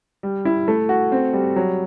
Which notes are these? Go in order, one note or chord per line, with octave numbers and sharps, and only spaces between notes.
G3
E4
A3
F#4
C4
G3
F#3